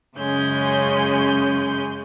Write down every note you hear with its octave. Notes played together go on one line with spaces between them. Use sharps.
F#2 C#3 G#3 C#4 G6